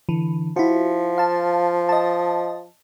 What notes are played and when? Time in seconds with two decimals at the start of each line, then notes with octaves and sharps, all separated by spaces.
0.09 D3 E3
0.56 F3 E4 F#4
1.18 F5 A5
1.89 D#5 A5